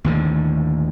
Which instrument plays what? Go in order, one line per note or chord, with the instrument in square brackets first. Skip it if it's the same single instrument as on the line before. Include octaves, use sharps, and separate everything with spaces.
[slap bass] D#2 A2 D3